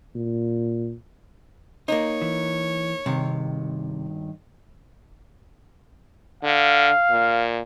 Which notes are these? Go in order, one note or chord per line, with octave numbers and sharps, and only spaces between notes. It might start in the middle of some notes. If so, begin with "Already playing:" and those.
A#2
A#3 D#4 C#5
E3
G2 C3 D#3
D3 F5
A#2